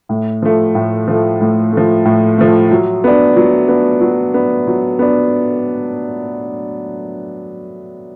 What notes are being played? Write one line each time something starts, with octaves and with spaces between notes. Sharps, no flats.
A2
F3 A3
A2
F3 A3
A2
F3 A3
A2
F3 A3
F#3
B3 D4
F#3
B3 D4
F#3
B3 D4
F#3
B3 D4